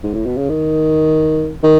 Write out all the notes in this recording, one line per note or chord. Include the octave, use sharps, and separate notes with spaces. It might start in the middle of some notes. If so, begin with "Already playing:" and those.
G#2
A2
B2
C#3
D#3
D#3